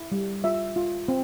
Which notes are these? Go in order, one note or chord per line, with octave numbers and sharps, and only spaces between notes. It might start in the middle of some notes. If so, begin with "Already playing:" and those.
Already playing: E4
G3
F4 E5
F4
C4